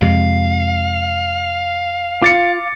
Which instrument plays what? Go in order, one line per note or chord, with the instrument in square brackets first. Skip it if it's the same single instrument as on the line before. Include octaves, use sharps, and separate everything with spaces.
[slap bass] F2 C3 G#3 [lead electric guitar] F5
[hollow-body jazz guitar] F4 [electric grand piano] D6 A6 C#7